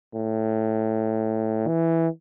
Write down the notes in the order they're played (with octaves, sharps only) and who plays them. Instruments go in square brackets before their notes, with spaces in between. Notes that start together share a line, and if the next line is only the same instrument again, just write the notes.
[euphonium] A2
E3